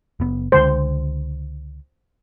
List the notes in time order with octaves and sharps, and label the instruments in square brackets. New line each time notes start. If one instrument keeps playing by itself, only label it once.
[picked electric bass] F#1 B3
[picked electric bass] C#2 D3 G#3 [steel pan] C5